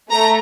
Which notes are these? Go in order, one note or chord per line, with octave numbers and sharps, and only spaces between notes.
A3 A#5